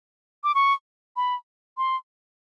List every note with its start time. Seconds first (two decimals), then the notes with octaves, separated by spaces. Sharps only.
0.44 D6
0.55 C#6
1.16 B5
1.78 C6